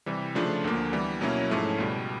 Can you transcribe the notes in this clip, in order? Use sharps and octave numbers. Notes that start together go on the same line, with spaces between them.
C3 E3 G3
C#3 F3 A3 D4 F4
D2 D3 F3 A#3
E3 G3 B3
B2 F#3 A#3 C#4 E4
G#2 F3 A3 C#4 E4
C#2 B2 G3